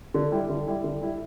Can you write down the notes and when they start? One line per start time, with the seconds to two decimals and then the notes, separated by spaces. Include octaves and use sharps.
0.14 D3
0.31 G3 E4
0.49 D3
0.67 G3 E4
0.84 D3
1.01 G3 E4